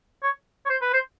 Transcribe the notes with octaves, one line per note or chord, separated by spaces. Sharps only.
C#5
C#5
C5
B4
C5